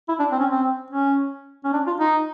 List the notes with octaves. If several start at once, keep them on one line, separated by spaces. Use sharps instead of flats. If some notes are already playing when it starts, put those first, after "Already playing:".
E4
D4
C4
C#4
C4
C#4
C#4
D4
F4
D#4